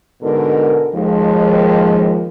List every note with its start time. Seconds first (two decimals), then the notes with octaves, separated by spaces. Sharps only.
0.22 G#2 B2 D3 A4 A#4
0.95 D#2 F3 G#3